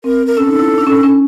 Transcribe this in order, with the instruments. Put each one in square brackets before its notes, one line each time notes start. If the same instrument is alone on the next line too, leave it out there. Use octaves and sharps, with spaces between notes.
[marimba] C4 [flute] A#4
[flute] A#4
[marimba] C#4 [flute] A4
[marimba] D#4
E4
D4
C#4
C#4